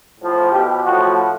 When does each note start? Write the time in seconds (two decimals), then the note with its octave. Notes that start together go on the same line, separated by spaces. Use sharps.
0.19 A2 F3
0.51 B2 G4
0.83 A2 F3 F#4